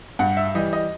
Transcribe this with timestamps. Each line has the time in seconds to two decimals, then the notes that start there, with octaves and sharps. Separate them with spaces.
0.19 G2 F#5
0.37 E5
0.55 E3 G3 D#5
0.73 D#5